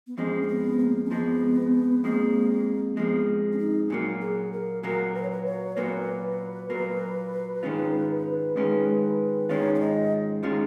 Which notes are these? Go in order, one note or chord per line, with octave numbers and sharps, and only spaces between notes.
B3
F2 F3 G#3 C#4
A#3
B3
A#3
C#4
F2 F3 G#3 B3
F2 F3 G#3 A#3
F2 F3 G#3 B3
C#4
D#4
A#2 F#3 A#3
G#4
A#4
A#2 F#3 A#3 A#4
B4
C#5
B4
C#5
A#2 F#3 A#3 B4
A#2 F#3 A#3
G#2 D#3 G#3 C#4 F4
G#2 D#3 G#3 C#4 F4
G#2 D#3 G#3 C#4 F4 C#5
C#5
D#5
D#3 G#3 C#4 F4